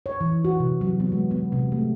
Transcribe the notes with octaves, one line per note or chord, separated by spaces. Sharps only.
C#5
E3
F#4
C3
F#3
B3
G#3
B3
C3
A3